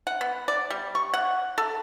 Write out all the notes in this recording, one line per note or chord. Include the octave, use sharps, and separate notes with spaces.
F#5
B3
D5
G3
C#6
F#5
A4